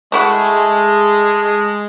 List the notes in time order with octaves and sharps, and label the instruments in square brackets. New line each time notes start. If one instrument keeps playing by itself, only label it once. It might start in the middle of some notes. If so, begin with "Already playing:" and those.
[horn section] G#3 [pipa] A3 E4 F#4